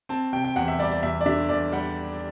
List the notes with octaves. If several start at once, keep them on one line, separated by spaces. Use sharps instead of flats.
C4 A5
C3 G5
G5
E2 F#5
E5
G3 D5
D5
E2 E5
D5
D3 E5
E2 D5
G3 F#5